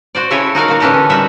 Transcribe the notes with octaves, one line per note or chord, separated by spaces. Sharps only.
F#4 C5 D5
C#3 E4 A4 C#5 G#5
D#4 F#4 A#4 F5
A#3 F#4
D3 E3 C#4 D4 G4 A4
G3 D#4 F#4 E5